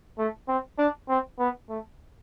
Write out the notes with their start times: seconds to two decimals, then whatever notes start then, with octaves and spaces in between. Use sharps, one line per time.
0.18 A3
0.48 C4
0.78 D4
1.09 C4
1.39 B3
1.69 A3